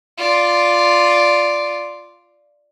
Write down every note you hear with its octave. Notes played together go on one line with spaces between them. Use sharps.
F4 D5